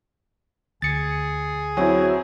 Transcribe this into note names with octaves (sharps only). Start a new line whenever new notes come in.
D2 G#4 A6 C#7
F#3 C4 E4 F#4 C#5 G#5